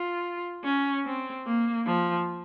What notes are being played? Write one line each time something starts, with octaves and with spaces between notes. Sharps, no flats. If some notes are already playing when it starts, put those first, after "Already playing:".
Already playing: F4
C#4
C4
A#3
F3